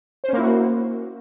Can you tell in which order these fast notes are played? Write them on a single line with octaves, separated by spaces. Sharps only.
C5 C#4 A#3 E4 F#4